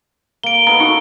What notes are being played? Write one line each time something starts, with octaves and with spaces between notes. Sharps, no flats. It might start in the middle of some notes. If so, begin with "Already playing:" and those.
A#3 D7 G7
B3 D#4 A4 A#5
D#4 F#4 C#6